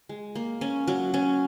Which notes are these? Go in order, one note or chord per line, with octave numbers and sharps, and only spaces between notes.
G#3
A#3
C#4
F#3
C#4